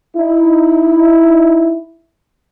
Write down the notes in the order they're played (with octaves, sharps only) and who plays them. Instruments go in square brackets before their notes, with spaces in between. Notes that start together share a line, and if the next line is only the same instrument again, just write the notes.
[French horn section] D#4 E4